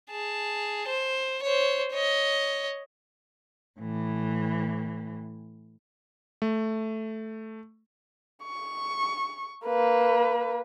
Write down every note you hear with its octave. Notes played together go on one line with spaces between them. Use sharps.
G#4 A5
C5
C5 C#5
C#5 D#5
A2 E3
A3
C#6
A#3 B4